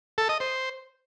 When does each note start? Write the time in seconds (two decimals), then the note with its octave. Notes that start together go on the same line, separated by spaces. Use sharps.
0.18 A4
0.29 D#5
0.40 C5